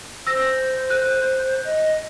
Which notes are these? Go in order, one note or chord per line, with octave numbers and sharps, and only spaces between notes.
C5 E6 A#6
F#6
D#5